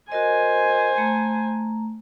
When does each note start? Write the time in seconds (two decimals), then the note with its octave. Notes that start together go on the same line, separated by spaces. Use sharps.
0.12 F#4 A#4 C5 D#5 G#5
0.98 A3 A#5